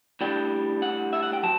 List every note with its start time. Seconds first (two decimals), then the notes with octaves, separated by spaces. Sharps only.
0.21 A2 G3 D4 G5
0.82 F#5
1.13 E5
1.22 F#5
1.33 G5
1.43 F#3 A5